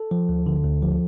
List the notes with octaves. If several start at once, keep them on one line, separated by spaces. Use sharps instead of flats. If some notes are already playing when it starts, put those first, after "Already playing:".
Already playing: A4
F3
D2
D3
D2
F3